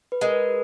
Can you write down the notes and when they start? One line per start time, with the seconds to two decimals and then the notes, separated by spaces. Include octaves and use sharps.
0.12 B4
0.21 G#3 A#4
0.31 B4